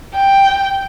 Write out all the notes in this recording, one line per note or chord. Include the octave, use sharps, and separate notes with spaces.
G5